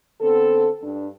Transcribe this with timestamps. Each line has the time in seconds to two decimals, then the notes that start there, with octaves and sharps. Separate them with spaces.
0.21 D3 B3 C4 A4
0.82 G2 D4